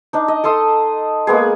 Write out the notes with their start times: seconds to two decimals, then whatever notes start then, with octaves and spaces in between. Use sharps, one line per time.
0.13 D4 D#4
0.28 D#5
0.44 A4 A5 C6 D#6
1.27 G#3 A#3 B3 G#4